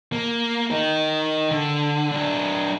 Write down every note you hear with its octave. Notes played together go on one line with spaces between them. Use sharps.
A#3
D#4 A#4
D3
F#3 D4